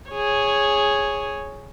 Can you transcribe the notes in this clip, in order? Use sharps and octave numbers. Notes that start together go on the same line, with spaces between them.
G#4 C#5